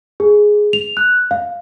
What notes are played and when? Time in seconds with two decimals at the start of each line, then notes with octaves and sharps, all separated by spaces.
0.20 G#4
0.73 F7
0.97 F#6
1.31 F5